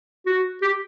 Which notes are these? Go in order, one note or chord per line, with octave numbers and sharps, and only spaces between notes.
F#4
G4